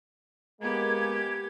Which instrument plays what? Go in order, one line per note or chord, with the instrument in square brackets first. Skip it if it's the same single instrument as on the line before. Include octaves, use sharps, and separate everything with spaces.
[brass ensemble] G#3 A#3 [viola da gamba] B3 G4 [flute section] G#6